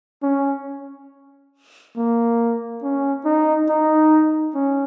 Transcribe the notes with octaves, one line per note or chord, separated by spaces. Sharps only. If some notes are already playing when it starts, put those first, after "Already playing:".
C#4
A#3
C#4
D#4
D#4
C#4